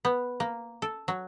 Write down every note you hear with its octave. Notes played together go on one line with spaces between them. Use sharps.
B3
A#3
A4
F#3